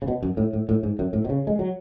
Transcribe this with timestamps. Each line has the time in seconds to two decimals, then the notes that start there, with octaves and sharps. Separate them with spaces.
0.02 C#3
0.08 B2
0.23 F#2
0.37 A2
0.53 A2
0.69 A2
0.83 G#2
0.99 F#2
1.13 A2
1.24 B2
1.29 C#3
1.47 G#3
1.59 F#3